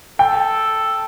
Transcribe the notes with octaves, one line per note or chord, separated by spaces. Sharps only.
A4 G5